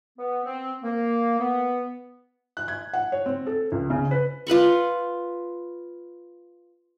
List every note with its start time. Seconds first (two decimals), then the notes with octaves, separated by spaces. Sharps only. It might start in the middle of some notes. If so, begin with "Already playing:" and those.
0.18 B3
0.45 C4
0.84 A#3
1.39 B3
2.57 F#6
2.68 G#6
2.93 F#5
3.12 C#5
3.26 C4
3.47 A4
3.72 C#2
3.90 C#3
4.11 B4
4.47 F4 B4 B5 C#6